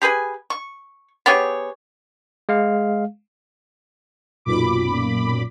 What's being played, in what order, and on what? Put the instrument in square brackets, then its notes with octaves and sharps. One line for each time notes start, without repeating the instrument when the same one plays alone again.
[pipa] G4 G#4 B4 G#5
C#6
B3 G4 G#4 C#5
[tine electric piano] G#3 F5
[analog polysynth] B1 F#2 A#2 B5 D6